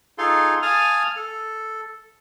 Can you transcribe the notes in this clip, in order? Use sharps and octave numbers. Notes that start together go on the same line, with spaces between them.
D#4 F4 G#4 A4 F5 C6
F5 G#5 A5 D#6 F6
A4